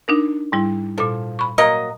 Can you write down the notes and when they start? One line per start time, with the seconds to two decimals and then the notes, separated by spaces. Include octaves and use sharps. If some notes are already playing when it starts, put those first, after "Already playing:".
0.08 D4 D#4 A#4
0.52 G#2 G3 E4
0.98 A#2 F3 A4
1.39 B5 C#6
1.58 F#3 A#3 D#5